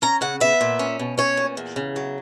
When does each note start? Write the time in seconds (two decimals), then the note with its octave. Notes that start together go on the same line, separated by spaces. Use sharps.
0.02 C#4 A#5
0.21 C#3 F#5
0.40 B3 E5
0.61 A#2
0.79 C#4
0.99 B2
1.18 C#4 C#5
1.37 A#2
1.57 E2
1.76 C#3
1.96 F#3